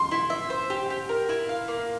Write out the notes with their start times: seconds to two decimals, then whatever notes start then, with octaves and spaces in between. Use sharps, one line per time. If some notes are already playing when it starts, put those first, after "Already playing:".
Already playing: C6
0.11 E4
0.30 E5
0.50 C5
0.70 G4
0.90 G4
1.09 A#4
1.29 E4
1.49 F5
1.68 A#3